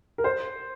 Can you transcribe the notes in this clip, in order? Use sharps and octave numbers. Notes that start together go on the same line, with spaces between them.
A#4
C5